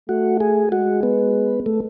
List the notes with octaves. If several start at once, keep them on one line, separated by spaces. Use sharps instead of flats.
A3 F#4
G#4
G#3 F#4
B3
A3